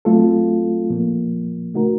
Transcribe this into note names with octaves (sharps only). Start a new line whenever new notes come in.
F#3 A3 C4 F4 A4
A#2 F3 A#3
C#3 A3 D#4 F#4 A#4